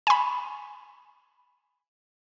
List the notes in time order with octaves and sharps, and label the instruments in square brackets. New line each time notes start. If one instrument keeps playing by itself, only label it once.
[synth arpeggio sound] G#5 B5